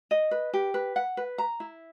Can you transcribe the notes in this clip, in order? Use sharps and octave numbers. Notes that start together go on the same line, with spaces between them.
D#5
B4
G4
B4
F#5
B4
A#5
E4